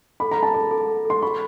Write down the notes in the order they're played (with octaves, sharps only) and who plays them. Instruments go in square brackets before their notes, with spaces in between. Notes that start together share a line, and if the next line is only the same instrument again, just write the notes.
[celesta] A4 [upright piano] B5
[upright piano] A#5
[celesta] A4
[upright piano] A5
[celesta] A4 [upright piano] A#5
[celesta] A4
A4
[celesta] A4 [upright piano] C6
[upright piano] B5 [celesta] C#6